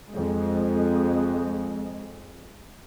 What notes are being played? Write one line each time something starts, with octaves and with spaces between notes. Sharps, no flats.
F2 G#3